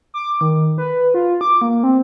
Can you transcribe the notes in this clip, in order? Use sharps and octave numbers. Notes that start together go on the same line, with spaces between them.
D6
D#3
B4
F4
D6
A#3
C4